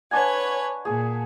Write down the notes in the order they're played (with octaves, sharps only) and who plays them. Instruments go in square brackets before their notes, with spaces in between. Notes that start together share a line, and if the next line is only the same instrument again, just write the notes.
[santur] D4 F#5 G#5 [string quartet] B4 C#5 G#6
[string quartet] A#2 [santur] G#4